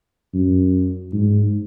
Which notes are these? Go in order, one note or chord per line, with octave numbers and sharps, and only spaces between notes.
F#2
G#2